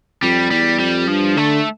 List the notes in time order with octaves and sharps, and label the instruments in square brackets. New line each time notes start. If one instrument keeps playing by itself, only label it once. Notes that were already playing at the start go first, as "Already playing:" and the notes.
[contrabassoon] F2 [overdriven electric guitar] G3
[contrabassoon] E2 [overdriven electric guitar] G3
[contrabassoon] F2 [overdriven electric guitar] G3
[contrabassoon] G2 [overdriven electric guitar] F3
[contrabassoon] D3 [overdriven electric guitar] A3